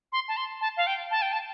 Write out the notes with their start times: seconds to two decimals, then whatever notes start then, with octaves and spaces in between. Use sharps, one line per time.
0.12 C6
0.28 A5
0.37 C6
0.60 A5
0.76 F5
0.86 G5
1.10 A5
1.21 G5
1.32 A5